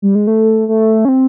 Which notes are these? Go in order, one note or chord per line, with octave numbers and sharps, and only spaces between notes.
G3
G#3
A3
A3
C#4
C4